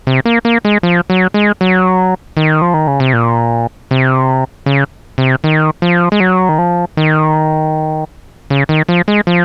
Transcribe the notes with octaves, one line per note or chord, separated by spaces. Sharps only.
C3
A#3
A#3
G#3
F3
F#3
G#3
F#3
D#3
F3
D#3
C#3
C3
A#2
C3
C#3
C3
D#3
F3
G#3
F#3
D#3
F3
D#3
C#3
D#3
F3
G#3
F3